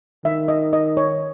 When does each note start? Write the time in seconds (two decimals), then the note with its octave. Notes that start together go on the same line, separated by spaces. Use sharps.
0.24 D#3 E5
0.48 D#5
0.73 D#5
0.97 C#5